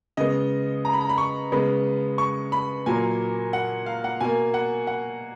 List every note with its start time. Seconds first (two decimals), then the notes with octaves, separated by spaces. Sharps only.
0.17 C#3 G#3 B3 D#5
0.85 A#5
0.93 B5
1.01 A#5
1.09 B5
1.18 C#6
1.52 C#3 G#3 B3 B5
2.18 C#6
2.52 B5
2.86 A#2 F#3 A#3 G#5
3.53 F#5
3.86 F5
4.04 F#5
4.21 B2 A#3 G#5
4.54 F#5
4.87 F#5